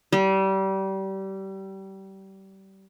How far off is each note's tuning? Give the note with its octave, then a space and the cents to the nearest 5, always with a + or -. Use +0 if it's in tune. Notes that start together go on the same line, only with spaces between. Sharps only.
G3 -25